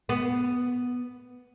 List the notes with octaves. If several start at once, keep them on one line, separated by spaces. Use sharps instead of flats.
B3